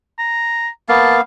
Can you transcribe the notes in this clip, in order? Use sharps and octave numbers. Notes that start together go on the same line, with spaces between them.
A#5
A#3 B3 F5 A5